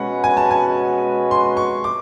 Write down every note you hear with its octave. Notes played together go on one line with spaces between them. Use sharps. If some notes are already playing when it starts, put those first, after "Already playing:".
Already playing: B2 G#3 C#4 F#4 B4 F#5
G#5
A5
G#5
C6
C#6
D6